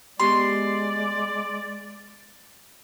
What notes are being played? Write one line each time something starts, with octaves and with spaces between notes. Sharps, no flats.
G#3 B3 G4 D5 C6 C#6